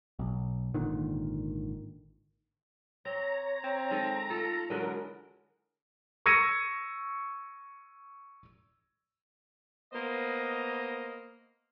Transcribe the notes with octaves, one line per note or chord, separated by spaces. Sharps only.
B1
G#1 A#2 D3 D#3
C4 C#5 A#5
C4
D#3 G#3 A4
A3 F4 A4
D3 E3 F#3 G#3 A#4
C#6 E6 G#6 A#6 C#7 D#7
A#3 B3 C5 D#5